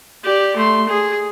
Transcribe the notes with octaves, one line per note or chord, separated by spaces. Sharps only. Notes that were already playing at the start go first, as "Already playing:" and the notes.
G4 D5
A3 C6
G#4